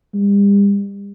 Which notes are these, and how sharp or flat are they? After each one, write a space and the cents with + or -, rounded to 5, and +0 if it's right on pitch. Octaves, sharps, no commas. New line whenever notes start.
G3 +40